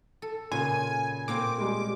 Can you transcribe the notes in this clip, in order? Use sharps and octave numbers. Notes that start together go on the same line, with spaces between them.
A4
A#2 C#3 G#5
A#2 A#3 C4 D6
G3 G#3